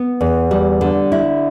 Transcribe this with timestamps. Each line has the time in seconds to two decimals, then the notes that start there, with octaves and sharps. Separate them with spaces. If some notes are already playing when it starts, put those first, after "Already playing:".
Already playing: B3
0.21 E2
0.51 G3
0.81 D3
1.12 E4